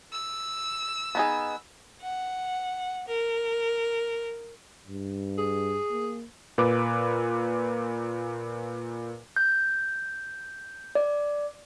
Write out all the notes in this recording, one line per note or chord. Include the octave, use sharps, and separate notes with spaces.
E6
B3 D#4 G#4
F#5
A#4
G2
G#4
A#3
A#2 B4 D6
G6
D5